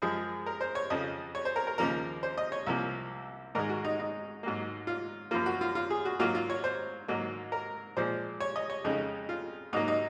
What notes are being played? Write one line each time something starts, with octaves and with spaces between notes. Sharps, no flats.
F#2 F3 G#3 G#4
A#4
C5
C#5
F2 C#3 F3 D#5
C#5
C5
A#4
A#4
D#2 C#3 F3 A#3 A#4
C5
D#5
C#5
C2 C3 F3 A#3
G#2 D#3 G#3 A#4
F#4
D#4
D#4
G#2 F#3 A#3
F4
F#2 F3 A#3 F4
F#4
F4
F4
G#4
F#4
G#2 F#3 A#3 F4
F4
C#5
C5
G#2 F#3 A#3
A#4
A#2 F3 G#3 C5
C#5
D#5
C#5
F2 C#3 G#3 D#4
F4
G#2 F#3 A#3 D#4
D#4